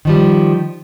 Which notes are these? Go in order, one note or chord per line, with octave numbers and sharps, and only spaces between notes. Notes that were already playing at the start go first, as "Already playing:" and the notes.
D#3 F3 G3